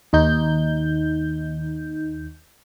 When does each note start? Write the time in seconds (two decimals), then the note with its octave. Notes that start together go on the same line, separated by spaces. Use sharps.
0.13 D#2 D#4 G6